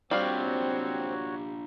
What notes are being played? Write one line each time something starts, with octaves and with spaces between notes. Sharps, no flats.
G3 C4 D4 F4 F#4 C#5 F5